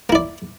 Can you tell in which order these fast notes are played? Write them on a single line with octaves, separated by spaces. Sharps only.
A#3 E4 D5